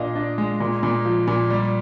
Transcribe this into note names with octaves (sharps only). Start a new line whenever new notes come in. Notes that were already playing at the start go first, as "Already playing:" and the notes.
Already playing: A#2 D4 D#5 F5
D4
G#3
A#2
A#2
F3
A#2
G3